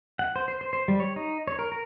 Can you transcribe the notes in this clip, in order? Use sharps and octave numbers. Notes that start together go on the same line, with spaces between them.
F#5
C5
C5
C5
C5
G3
C#5
D#4
C#5
A#4
A#4